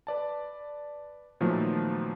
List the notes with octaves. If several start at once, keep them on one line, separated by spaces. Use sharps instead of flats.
B4 D5 A5
A#2 D#3 F3 F#3 A3 B3